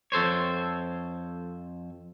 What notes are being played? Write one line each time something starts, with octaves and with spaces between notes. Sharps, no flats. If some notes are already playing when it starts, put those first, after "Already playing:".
F2 A4 C5 C#5